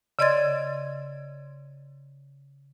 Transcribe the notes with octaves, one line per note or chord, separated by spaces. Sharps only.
C#3 D5 D#5 C6 G#6 A6